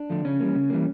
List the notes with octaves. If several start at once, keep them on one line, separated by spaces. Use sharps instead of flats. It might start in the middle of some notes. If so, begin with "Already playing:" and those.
Already playing: D4
D3 F3 A3
C#3 C#4
E3 G3 A#3
C#3
E3 G3 A#3